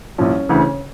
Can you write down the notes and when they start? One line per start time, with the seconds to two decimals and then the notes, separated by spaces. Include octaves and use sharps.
0.18 C2 A#2 F3 C#4
0.49 D2 C#3 E3